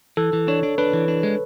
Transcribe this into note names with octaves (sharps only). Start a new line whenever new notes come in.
E3 A4
E3
D4 C#5
D4
D4 B4
E3
D4
G#3